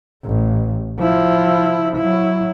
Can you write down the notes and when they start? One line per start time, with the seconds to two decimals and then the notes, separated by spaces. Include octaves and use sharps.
0.25 A1
0.99 F3 E4
1.97 F#3 E4